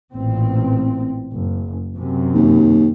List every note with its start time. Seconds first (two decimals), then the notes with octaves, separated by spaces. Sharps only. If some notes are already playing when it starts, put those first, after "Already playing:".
0.13 A1 A#2 C4
1.33 F#1
1.97 F#2 C3
2.34 D#2